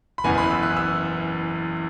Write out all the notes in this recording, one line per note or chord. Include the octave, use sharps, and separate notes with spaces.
B5
F#1 E2 E3 G#5
B5
E6
F#6
E6